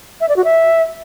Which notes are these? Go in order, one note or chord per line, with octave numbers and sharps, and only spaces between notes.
E5
D5
F#4
E5